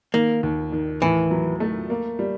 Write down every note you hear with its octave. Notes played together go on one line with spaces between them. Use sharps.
D#3 A#3
D#2
D#3
A2 E3
F#3
A3
A#3
G3